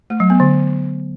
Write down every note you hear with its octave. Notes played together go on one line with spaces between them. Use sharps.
A3
F#3
B3
D3